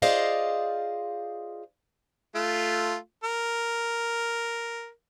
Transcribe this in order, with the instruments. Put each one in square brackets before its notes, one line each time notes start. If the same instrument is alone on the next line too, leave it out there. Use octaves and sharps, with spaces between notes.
[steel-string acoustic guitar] F4 G#4 C5 D5 D#5 F5
[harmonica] A3 F4
A#4